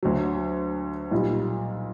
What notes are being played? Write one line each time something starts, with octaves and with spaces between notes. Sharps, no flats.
D2 D3 F#3
B1 A#2 G3